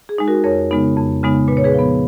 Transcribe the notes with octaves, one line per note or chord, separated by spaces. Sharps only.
G#4
G#3 D#4
F#4 A#4
F2 A#4 C#5
C#3 G#3 B3 D#4
F2
C#3 G#3 B3 D#4
A#2 B4
C#5
G#4 B4
F3 B3